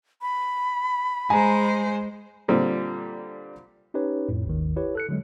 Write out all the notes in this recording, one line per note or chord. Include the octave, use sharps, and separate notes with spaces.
B5
G#3 C5 G#5 A#5
A#2 D3 G3 C4
C#4 D#4 G4 B4 C#5
F2 A2
G#1 D#2 D#3
E4 G4 B4 C#5
A4 F#6 C#7
D3 F#3 G#3